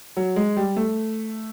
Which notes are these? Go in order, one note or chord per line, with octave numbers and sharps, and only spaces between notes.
F#3
G#3
G3
A3